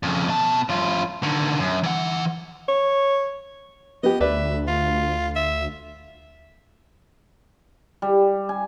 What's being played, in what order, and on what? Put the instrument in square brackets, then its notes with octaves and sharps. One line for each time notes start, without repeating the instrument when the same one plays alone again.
[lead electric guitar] F2 C#3
B2 A5
F#2 F4
D3 D#3
F#2
E3 F#5
[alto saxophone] C#5
[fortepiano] B3 G4 [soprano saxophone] D#5
[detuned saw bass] D2 [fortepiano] B4 D5 [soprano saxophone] E5
[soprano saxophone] F4
E5
[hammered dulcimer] G3
G#5